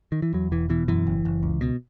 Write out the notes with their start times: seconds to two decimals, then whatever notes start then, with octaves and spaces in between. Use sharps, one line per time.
0.12 D#3
0.22 E3
0.33 E2 F#3
0.52 E1 E3
0.69 B2 E3
0.88 F#2 E3
1.07 F#1
1.25 F#1
1.43 C#2
1.61 B2